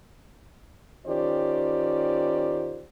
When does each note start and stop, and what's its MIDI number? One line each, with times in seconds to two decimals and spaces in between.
1.06 2.85 51
1.06 2.85 61
1.06 2.85 65
1.06 2.85 67
1.06 2.85 72
1.06 2.85 74